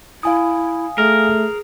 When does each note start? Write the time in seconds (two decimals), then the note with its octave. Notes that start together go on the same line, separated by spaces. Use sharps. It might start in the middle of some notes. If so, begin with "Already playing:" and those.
0.23 E4 F5 G#5 D#6
0.98 A3 G#4 A#4